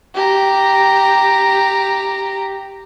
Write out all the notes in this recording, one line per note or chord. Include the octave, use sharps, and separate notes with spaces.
G4 A#5